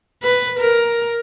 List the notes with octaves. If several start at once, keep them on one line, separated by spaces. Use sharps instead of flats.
B4
A#4